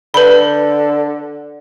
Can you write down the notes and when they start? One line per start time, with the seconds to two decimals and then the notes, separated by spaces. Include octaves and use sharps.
0.14 D3 B4 B5